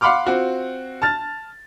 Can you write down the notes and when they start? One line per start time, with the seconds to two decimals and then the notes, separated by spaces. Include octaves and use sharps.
0.01 F5 F#5 B5 C6 D6 F6
0.27 C4 F4 F#4
1.02 A5 F6 A6